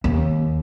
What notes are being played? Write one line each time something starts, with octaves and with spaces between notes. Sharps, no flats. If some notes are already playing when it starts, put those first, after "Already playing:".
D#2